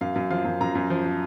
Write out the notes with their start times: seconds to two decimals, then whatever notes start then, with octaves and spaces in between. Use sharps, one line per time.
0.01 F#2 F5
0.16 F#2
0.30 F3 F5
0.45 F#2
0.60 F#2 A#5
0.75 F#2
0.90 F3
1.05 F3